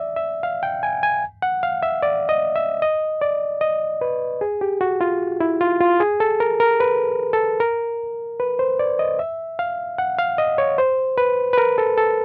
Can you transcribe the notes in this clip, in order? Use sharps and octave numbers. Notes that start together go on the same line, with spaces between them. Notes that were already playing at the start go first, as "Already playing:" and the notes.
Already playing: D5 E5
E5
F5
G5
G#5
G#5
F#5
F5
E5
D5
D#5
E5
D#5
D5
D#5
B4
G#4
G4
F#4
F4
E4
F4
F4
G#4
A4
A#4
A#4
B4
A4
A#4
B4
C5
D5
D#5
E5
F5
F#5
F5
D#5
C#5
C5
B4
B4
A#4
A4
A4